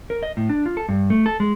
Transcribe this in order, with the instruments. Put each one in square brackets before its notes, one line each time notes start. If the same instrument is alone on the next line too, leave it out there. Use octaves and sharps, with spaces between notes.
[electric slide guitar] A#4
D#5
A2
D4
F4
A4
G2
A3
A4
G#3